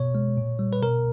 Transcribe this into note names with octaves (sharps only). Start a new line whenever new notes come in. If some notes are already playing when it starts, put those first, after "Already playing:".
Already playing: B2 C#5
G#3
A#2
G3
B4
B2 A#4